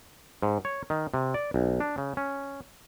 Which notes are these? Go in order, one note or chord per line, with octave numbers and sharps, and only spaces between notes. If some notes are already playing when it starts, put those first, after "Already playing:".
G#2
C#5
D#3
C3
D5
B1
D4
C#3
C#4